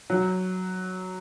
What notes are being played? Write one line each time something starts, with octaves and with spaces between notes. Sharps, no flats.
F#3